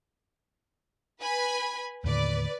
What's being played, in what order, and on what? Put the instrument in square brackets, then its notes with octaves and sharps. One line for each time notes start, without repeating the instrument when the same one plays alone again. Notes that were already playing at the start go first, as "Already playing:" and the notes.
[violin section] B4 G#5 B5
[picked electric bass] D#2 A2 D3 [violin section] B4 D5